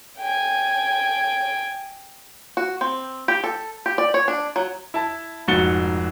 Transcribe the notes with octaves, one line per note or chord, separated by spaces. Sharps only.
G5 G#5
F#4
C4
G4
A4
G4
D5
C#5
D4
F#3
E4 A5
F1 G#2 F#4 A6 C#7 G7